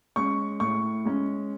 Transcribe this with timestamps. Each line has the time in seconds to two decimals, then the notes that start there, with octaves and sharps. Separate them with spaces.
0.16 G#3 C#4 C#6
0.60 A2 C#6
1.05 G#3 C#4